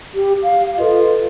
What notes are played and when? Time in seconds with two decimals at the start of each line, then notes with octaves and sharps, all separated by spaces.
0.15 G4
0.43 F5
0.78 F4 A4 B4 D#5